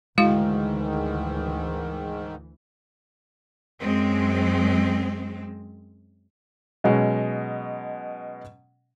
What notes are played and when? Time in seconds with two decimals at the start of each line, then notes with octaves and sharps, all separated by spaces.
0.18 D2 G#2 D#3 E3 G#3 E4 F#4 F5
3.81 F#2 G#3 C4
6.84 B2 F#3 G#3 C#4